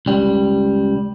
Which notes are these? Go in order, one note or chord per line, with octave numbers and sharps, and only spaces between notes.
C#2 G3